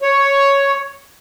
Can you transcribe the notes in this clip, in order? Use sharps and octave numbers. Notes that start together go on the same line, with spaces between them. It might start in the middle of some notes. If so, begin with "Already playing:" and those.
C#5